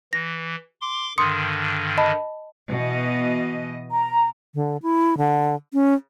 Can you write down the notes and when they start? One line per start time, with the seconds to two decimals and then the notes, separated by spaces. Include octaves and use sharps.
0.13 E3 A#6
0.81 C6 D6
1.18 G2 D3 D#3 C6 D#6 C#7
1.97 D#5 A5 B5
2.70 B2 E3 D#5
3.91 A#5
4.55 D3
4.82 E4
5.18 D3
5.73 C#4